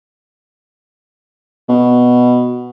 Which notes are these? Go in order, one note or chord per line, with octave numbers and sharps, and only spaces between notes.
B2